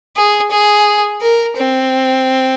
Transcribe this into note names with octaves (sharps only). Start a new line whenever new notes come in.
G#4
G#4
A#4
C4